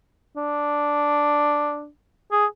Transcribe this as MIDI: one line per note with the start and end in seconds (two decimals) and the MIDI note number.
0.36 1.88 62
2.31 2.45 68